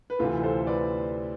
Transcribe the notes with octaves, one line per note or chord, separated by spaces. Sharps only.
B4
D2 C3 E3 F4 A4
A4 C5
B4 D5